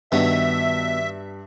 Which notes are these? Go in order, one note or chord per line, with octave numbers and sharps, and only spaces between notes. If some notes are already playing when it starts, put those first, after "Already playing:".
G2 B2 D#3 C#5 E5